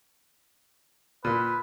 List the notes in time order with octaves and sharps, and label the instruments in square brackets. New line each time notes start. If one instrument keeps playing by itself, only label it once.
[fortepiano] A#2 [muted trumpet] B4